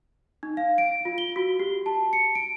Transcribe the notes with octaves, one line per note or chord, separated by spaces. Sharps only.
D#4
F5
D7
F4
G7
F#4
G4
A5
C#7
D7